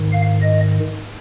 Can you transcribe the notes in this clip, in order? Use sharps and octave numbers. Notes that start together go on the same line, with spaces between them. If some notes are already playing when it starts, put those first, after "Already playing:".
Already playing: G#2 D#3
F5
D#5